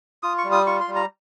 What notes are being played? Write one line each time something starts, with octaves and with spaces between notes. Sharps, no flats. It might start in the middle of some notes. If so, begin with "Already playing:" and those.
F4 D#6
C#6
G3
D#6
F4 C#6
C6
G3
A#5